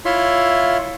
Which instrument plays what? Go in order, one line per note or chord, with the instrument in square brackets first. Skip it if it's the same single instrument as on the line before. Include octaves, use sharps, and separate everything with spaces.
[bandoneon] E4 F4 C#5 E5 C6